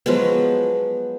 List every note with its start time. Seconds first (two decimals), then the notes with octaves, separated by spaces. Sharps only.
0.06 F3 F#3 G#3 B3